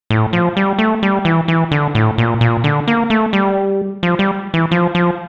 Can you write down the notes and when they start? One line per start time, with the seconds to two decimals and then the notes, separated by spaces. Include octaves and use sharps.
0.10 A2
0.33 F3
0.57 G3
0.79 A3
1.03 G3
1.25 E3
1.48 E3
1.71 D3
1.95 A2
2.18 A#2
2.41 A#2
2.64 D3
2.87 A#3
3.10 A3
3.33 G3
4.03 F3
4.19 G3
4.54 E3
4.71 F3
4.95 F3